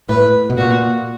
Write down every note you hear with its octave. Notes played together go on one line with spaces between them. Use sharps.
A2 B4
B2
A#2 F#4